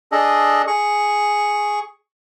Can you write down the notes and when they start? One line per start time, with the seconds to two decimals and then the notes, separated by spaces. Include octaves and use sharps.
0.12 D4 G#4 A4 D#5
0.67 G#4 C#6